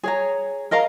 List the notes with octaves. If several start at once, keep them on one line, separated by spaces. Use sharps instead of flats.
G#4 C#5 A#5
A#4 D#5 F5 A#5